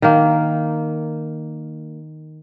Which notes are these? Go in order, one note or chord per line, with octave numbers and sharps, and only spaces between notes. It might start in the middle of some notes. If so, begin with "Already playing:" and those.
D#3 A#3